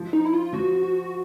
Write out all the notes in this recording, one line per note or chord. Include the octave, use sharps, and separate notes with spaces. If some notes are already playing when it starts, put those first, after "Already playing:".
Already playing: F3
D#4
E4
F4
F3 F#4
F#4